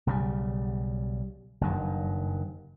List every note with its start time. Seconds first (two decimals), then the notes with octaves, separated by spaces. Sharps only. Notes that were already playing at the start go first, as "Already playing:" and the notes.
0.07 B1 C#3 E3 G3
1.61 F#1 G2 D#3